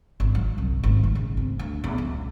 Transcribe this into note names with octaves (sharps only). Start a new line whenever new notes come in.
G#1
F#3
C2
G#1
A3
C#3
C4
D2
E2
C#2